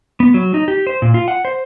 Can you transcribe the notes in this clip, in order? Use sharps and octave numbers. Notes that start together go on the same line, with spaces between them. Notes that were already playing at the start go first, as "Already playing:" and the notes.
B3
F#3
D#4
G4
C5
A#2
F4
F#5
C5